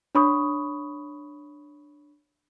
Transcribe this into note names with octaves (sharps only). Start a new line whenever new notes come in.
D4 C#5 B5 C#6 D#6